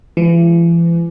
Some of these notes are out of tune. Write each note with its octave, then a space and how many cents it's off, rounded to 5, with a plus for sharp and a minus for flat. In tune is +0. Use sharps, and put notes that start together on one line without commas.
E3 +40 G#3 +0